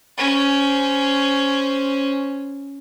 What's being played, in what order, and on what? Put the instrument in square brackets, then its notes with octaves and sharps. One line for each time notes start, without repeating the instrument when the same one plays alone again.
[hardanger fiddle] C#4 C5